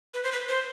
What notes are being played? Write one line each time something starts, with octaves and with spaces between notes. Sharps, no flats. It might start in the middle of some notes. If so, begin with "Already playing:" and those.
B4
C5
B4
C5